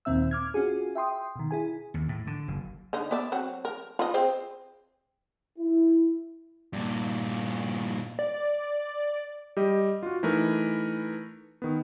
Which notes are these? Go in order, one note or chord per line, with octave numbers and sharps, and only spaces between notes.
D#2 A#2 D#3 C4 E5 E6
D6 F6 G#6
C#4 F4 F#4 G#4
E5 G5 C6 D#6
B2 D#3
E4 G#4 G#5
D#2
A2
D3
F#1
D3 D#4
B3 D5 E5
F#3 C4 F#4
A#4
F4 B4 D#5
C4 G#4 C5
E4
G2 A#2
D5
G3 G4 D#5
F4 F#4
E3 A3 D#4 A#4 B4
D#3 B3